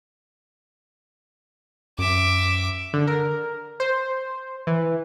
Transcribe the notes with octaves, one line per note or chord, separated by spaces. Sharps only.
F#2 E5 D6
D3
A#4
C5
E3